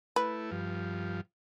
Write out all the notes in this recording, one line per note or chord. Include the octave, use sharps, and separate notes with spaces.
A3 E4 B4
G2 F3